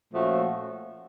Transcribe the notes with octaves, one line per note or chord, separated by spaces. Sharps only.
A#2 F3 A3 C#4 F#4